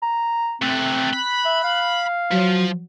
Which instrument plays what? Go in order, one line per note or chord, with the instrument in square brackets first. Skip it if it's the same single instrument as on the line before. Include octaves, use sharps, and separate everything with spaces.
[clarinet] A#5
[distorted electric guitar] C3 A3 [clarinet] C4 [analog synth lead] F#6
[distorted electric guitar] B5
[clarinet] E5
F5
[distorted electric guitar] F3 [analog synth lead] F#3